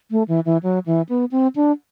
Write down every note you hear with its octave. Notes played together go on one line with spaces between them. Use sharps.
A3
E3
E3
F#3
E3
B3
C4
D4